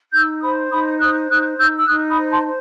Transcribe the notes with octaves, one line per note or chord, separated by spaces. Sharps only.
D#4 E6 G6
C5 B5 D#6
D#4 B5 D#6
C5 D#6 F#6
D#4 D#6 F#6
D#4 E6 G6
E6
D#4 D#6 F#6
B5 D#6
C5
A5 C6
C5